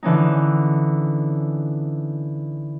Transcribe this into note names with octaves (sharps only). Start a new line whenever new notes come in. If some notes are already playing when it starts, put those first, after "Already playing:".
D3 E3 C#4 D#4